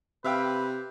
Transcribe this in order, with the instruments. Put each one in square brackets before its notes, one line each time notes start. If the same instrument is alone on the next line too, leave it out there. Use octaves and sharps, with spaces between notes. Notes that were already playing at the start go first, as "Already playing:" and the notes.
[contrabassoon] C3 [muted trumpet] B4 [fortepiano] E5 F5 G5